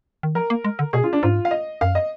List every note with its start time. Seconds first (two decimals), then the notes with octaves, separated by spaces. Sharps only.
0.23 D#3
0.35 F3 A#4
0.50 A#3
0.65 G#3
0.79 D3
0.93 B2 G#4
1.04 F4
1.13 D4
1.23 G#2 F4
1.45 F5
1.51 D#5
1.81 F#2 F5
1.95 D#5